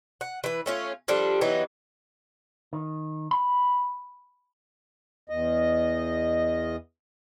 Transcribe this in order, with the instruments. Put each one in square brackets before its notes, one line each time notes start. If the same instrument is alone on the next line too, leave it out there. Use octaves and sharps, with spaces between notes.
[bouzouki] F#5
E3 B4
A3 C#4 F4
F3 G3 D4 A4
E3 F#3 B3 D#4
[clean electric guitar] D#3
B5
[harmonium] E2 D#5